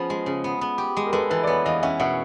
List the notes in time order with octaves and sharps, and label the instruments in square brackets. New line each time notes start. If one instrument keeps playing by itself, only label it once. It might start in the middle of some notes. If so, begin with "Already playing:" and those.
Already playing: [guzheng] F3 B3 C#4 [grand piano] G#4
[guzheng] G#3
C#3
B3
B3
G4
G#3
[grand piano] A#4
[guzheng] G#3 [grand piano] A4 B4
[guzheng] E3 [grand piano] A4 B4
[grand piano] D5
[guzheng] B3 [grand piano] B4 C#5
[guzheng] E3 [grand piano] D#5 F5
[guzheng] C#4 [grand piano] E5 F#5
[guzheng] B2 [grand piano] E5 F#5